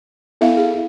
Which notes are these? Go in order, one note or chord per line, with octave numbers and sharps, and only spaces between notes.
B3 E4 A4 E5 F5
G#4